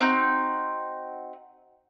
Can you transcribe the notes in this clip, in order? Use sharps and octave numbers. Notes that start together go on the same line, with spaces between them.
C4 D#4 F#4